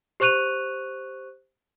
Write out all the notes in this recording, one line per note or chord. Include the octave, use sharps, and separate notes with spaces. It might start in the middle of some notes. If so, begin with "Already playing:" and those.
G4 C5 C#6 F#6 D#7 F7